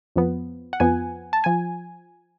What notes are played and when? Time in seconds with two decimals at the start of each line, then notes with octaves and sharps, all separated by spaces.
0.16 F2 F3 B3
0.73 F#5
0.80 F2 F3 B3 G#5
1.33 A5
1.44 F3 G#5